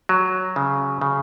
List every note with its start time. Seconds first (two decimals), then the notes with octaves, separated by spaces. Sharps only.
0.09 F#3
0.56 C#3
1.01 C#3